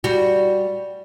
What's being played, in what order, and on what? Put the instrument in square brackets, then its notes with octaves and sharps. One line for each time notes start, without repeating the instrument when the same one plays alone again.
[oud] G3 F#4